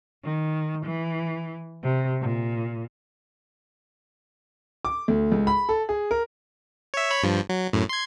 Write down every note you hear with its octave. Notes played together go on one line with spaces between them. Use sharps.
D#3
E3
C3
A#2
D6
D2
C#2
B5
A4
G#4
A#4
C#5 E5
C#5 B5
G2 F3
F#3
F#2 A2
C6 G#6